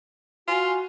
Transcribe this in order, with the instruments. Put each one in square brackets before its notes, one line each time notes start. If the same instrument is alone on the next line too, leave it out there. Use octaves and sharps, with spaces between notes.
[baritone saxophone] F4 [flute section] F#4 G#5